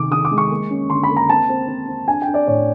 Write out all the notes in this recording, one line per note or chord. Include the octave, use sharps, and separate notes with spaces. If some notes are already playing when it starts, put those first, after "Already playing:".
Already playing: C3 D#3 D6
D#3 D#6
D6
G#3
C#6
A#3
C#4
D3 C6
B5
A#3
A#5
C4 A5
C4
C4
C4
D4 G#5
G5
D4
D5
A2 C#5